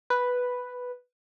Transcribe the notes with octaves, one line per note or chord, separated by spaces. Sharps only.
B4